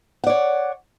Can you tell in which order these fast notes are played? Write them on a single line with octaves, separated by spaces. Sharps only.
F#5 D5 C#5